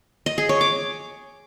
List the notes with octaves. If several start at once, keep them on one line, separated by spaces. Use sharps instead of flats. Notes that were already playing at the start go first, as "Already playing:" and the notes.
D#5
G#4
C#5
D6